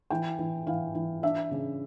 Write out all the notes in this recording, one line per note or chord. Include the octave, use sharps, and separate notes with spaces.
E3 G5
E3
E3 F5
E3
D4 E5
C#3